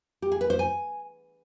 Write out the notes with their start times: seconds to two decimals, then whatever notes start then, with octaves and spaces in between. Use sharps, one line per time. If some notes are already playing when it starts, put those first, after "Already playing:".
0.22 G4
0.32 G#4
0.41 B4
0.50 C5
0.59 G#5